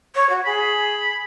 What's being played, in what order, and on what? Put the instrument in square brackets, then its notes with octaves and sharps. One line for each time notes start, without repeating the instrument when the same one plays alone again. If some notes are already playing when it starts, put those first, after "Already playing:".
[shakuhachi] C#5
F#4
[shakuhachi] G#4 [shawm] B5